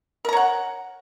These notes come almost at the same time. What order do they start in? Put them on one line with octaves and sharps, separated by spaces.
A#4 A#5 C#5 F#5